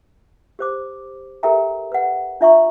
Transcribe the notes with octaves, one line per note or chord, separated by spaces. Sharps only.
G4 C5 D6
G4 A4 A#4 E5 G5 A#5
B4 F#5
D4 F4 E5 G5 A#5 C#6